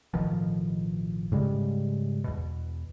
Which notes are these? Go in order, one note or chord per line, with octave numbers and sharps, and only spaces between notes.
A1 B2 D#3 F3
G#2 C#3 G3 G#3
E2 B2